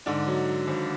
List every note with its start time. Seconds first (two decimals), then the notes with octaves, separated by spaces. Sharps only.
0.06 G#2 D3 D4
0.27 F#3
0.47 F#3
0.68 G#1